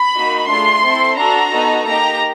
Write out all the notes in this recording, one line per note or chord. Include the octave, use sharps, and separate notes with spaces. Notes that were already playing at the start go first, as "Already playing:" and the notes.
Already playing: B5
A#3 D#4 F#4
A3 D4 F4 G#4 C6
C4 E4 A4
D4 F#4 A4 A#5
B3 D#4 F#4 A4
A#3 D#4 G4 A#5